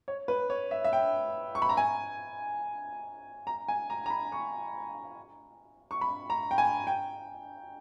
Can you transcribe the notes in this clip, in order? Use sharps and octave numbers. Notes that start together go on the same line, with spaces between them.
C#5
B4
C#5
E5
E5
G5
C#6
B5
A#5
G#5
A#5
G#5
A#5
A#5
B5
C#6
C#6
B5
A#5
G5
G#5
G5